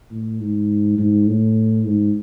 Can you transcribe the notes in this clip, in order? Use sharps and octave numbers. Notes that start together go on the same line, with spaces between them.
A2
G#2
G#2
A2
G#2